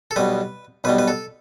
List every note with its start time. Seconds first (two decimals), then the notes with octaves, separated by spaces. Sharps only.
0.11 A4
0.16 B1 B2 G3 B4
0.84 B1 B2 G3 B4
0.99 B4
1.08 A4